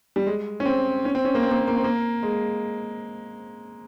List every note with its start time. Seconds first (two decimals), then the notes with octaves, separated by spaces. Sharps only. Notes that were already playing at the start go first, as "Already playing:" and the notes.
0.16 G3
0.27 G#3
0.60 C#4
0.66 C4
1.05 C#4
1.15 C4
1.25 C#4
1.35 A#3
1.43 C4
1.51 A#3
1.59 C4
1.68 A#3
1.76 C4
1.84 A#3
2.23 G#3